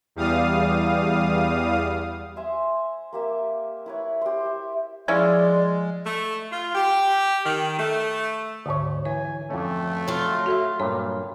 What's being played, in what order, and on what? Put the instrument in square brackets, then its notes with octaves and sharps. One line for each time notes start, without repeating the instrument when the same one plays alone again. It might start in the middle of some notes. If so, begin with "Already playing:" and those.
[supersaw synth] E2 G3 F5 D#6
[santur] C5 E5 G#5 C6
A#3 G4 E5
E4 B4 C#5
G4 C5
E5
[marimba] F3 [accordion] G#3 [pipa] C#4 E4 F4 [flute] D5
[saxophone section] A3
F4
G4
D#3
A3
[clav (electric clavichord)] D2 C#5 [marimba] G#2 D3
[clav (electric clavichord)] E3 [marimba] C#5 [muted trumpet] G#5
[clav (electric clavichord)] F2 C#4 [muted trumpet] A3
[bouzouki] F#3 F4
[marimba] F#4 A4 E5
[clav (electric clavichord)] G2 A#2 [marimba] C#5